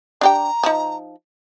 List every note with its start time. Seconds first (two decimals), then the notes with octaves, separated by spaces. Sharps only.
0.21 D4 G4 G5 A#5
0.64 F3 D#4